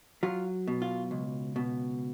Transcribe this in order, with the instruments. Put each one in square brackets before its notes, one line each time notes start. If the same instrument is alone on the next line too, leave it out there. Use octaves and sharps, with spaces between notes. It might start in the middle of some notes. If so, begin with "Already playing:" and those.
[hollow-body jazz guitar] F#3 F4
B2
F4
C#2
B2